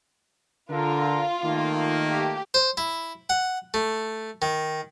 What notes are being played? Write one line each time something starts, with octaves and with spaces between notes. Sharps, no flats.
D3 F4 A#4
D#3 A3 A#3
G4
C5
E4
F#5
A3
D#3